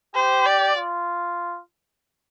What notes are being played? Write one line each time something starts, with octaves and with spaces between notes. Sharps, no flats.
G4 C5
D5
F4